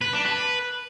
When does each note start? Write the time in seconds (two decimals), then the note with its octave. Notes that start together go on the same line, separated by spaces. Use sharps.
0.01 B4
0.13 D4
0.25 B4